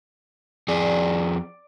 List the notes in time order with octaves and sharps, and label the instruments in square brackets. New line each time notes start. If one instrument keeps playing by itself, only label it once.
[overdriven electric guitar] F2 G#4 [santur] D5